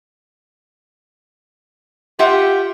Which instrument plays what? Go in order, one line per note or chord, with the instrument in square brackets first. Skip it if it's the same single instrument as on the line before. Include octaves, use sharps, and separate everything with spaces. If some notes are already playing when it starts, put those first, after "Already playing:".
[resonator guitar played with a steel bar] F4 E5 F#5 [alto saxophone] G4